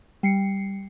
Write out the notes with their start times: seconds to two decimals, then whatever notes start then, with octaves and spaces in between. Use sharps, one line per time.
0.23 G3 C7 C#7